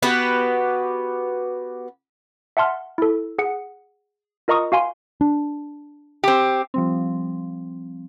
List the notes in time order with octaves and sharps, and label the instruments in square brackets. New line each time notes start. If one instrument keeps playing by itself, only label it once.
[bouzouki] B3 F#4 G4 B4
[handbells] E5 F#5 A5 C6 F6
E4 A4
G#4 F#5 C#7
F4 A#4 D#5 A#5 C#6 D#6
F#4 F5 G#5 C6
[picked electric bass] D4
[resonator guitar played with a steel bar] C4 G4
[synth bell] F3 G3 C4